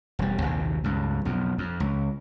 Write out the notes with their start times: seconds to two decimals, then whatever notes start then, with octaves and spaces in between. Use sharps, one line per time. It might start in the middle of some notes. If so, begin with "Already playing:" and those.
0.19 E1 G3
0.42 A#1 D#2 C3
0.84 C#2 G2
1.25 B1 F2
1.58 F2
1.80 C#2